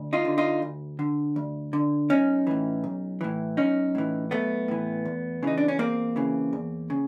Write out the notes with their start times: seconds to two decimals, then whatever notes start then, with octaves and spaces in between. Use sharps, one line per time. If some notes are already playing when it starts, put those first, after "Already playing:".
Already playing: D2
0.13 D#4 F4
0.25 D3
0.38 D#4 F4
0.62 D2
0.99 D3
1.36 D2
1.73 D3
2.10 B1 C#4 D#4
2.47 A2 E3
2.84 B1
3.21 A2 E3
3.57 B1 C#4 D#4
3.95 A2 E3
4.31 B1 A3 B3
4.68 A2 E3
5.05 E2
5.43 C#3 E3 D#4
5.58 D4
5.68 C#4
5.79 E2 A#3 C4
6.16 C#3 E3
6.53 E2
6.90 C#3